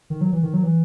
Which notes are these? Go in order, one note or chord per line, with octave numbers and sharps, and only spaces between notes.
D#3
F#3
E3
D#3
F#3
E3